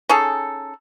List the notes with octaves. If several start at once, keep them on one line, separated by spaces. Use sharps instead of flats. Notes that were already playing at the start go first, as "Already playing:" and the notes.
C#4 D#4 G#4 A4